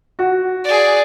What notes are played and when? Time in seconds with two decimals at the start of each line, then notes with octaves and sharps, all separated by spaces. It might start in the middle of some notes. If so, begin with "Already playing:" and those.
0.19 F#4
0.65 G#4 D5